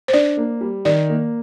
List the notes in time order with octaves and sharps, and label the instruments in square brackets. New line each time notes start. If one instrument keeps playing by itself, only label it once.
[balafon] C5
[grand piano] D4 [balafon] D5
[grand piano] A#3
G3
[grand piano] D#3 [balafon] D5
[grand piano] A#3